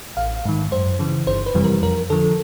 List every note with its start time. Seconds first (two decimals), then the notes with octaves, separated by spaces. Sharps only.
0.17 A1 F5
0.45 G#2 D#3
0.72 F#2 C5
0.99 C#3 E3
1.27 G1 C5
1.46 B4
1.54 F2 C3 E3 G3
1.64 A#4
1.82 F2 A#4
2.10 D3 F3 A4